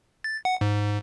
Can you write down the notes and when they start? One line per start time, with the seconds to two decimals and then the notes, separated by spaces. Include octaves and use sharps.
0.24 A6
0.45 F#5
0.61 G#2